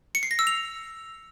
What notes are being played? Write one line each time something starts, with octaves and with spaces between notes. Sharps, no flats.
C#7
C7
A#6
E6
F7